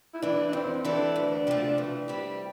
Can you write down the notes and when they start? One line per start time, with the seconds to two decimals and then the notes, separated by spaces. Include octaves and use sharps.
0.14 E4
0.22 E3 A3 D4
0.48 D4
0.53 F2 C4
0.84 E3 A3 D4 E4 A4
1.16 D2
1.47 C3 F3 A3
1.78 E3
2.08 G3 C4 E4 G4